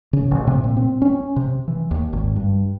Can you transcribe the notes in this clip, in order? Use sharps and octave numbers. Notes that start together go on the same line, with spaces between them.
C#3
A1
C3
A#2
C4
C#4
C3
E3
D#2
G#1
G2